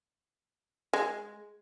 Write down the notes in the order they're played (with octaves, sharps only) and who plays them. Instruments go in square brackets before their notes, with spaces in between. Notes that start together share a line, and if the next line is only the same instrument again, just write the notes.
[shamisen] G#3